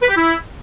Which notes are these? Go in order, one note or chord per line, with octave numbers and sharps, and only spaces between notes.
B4
G4
E4